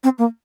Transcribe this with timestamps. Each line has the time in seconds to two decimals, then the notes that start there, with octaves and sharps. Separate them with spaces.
0.04 C4
0.18 A#3